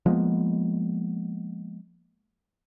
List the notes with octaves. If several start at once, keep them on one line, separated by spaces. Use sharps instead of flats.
F3 G#3 A#3 B3